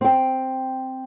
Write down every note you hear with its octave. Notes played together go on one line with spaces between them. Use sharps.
C4 G5